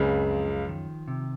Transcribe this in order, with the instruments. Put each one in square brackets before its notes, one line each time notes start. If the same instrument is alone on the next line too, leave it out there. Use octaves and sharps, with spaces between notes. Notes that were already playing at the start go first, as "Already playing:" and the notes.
Already playing: [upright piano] C#2 C#3 [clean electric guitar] F#2 C4
[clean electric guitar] F3
D#3
C3